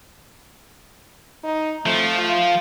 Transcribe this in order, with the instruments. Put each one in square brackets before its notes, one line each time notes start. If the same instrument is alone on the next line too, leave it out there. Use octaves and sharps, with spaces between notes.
[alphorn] D#4
[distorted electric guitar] F3 [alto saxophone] A3 [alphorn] C4
[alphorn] F4